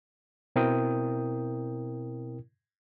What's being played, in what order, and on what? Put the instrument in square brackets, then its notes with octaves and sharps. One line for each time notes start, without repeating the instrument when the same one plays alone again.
[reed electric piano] B2 C4 E4 A#4 G5 D#6